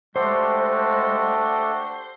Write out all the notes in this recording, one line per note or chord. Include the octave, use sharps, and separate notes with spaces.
G#3 A3 D4 F#4 G4 A4 C5